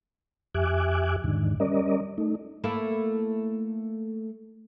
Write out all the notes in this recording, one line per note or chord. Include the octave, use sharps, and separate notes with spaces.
F2 G4 E5 G#5 D6 F#6
E2 G#2 D3 D#3
G3 C#4 A#4 D5 D#5
A3 D#4
A3 A#3 E4